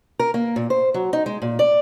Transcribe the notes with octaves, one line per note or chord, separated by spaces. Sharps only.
A#4
A#3
A#2
C5
F#3
D#4
G#3
A#2
D5